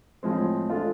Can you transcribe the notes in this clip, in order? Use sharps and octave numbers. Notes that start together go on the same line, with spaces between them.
A2 F3 G#3 C4
G#3 D4 F4 A4